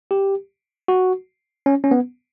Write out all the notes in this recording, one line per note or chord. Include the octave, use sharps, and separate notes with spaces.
G4
F#4
C#4
C#4
B3